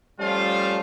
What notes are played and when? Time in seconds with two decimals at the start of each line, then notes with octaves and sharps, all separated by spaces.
0.19 F3 G3 A3 C#4 F4 F5